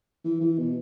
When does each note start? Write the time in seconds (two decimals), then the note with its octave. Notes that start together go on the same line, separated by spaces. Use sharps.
0.24 E3
0.40 E3
0.58 B2